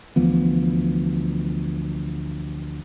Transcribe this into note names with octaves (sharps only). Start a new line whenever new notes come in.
D2 E3 F3 B3